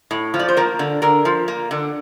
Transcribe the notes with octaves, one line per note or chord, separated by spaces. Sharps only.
A2
F3
D5
C5
A#3 A#4
D3
D3 A#4
F3
A#3
D3